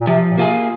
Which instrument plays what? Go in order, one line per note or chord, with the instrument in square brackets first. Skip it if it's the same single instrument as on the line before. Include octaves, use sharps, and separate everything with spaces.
[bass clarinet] A#2
[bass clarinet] C3 [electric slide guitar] F3
[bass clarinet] A#2
[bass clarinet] C3 [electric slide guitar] A#3 F4 G#4